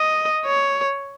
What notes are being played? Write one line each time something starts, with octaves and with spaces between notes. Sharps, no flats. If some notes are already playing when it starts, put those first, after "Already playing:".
Already playing: D#5
C#5